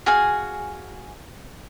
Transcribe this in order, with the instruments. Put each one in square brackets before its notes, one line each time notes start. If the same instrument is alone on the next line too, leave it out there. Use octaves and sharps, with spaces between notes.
[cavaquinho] F#4 G#4 F5 G#5